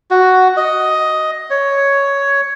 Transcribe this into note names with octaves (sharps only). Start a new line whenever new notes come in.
F#4
D#5
C#5